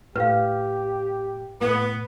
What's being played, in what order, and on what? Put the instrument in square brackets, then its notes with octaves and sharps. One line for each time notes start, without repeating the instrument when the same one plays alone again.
[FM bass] A2 [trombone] G4 [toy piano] B4 F5
[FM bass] A2 [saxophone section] B3